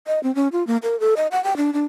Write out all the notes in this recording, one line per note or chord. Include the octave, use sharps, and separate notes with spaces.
D#5
C4
C#4
F4
A#3
A#4
A4
D#5
F#5
G5
D4
D4